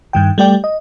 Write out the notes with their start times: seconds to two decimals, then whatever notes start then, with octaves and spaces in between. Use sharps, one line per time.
0.13 G2 D#3 G5
0.38 G3 A3 G4 D5 G5
0.64 D#5